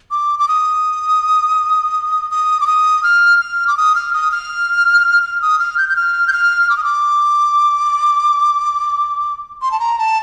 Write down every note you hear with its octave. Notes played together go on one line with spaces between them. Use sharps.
D6
D6
D#6
D#6
D6
D#6
F6
F6
D6
D#6
F6
D#6
F6
F6
D#6
F6
G6
G6
F6
G6
F6
D6
D#6
D6
C6
A5
A#5
A5